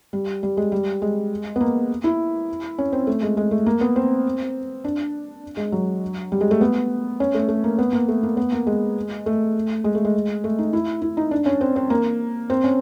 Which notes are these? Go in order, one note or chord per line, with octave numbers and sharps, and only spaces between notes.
G3
G3
G#3
G3
G#3
B3
A#3
E4
C#4
C4
A3
G#3
G#3
A3
A#3
B3
C4
D4
G#3
F#3
G3
G#3
A3
B3
C#4
A3
A3
A#3
B3
A#3
A3
A#3
B3
A#3
G#3
A3
G#3
A3
G#3
A3
D#4
E4
E4
D#4
D4
C#4
C4
C4
A#3
C4
C#4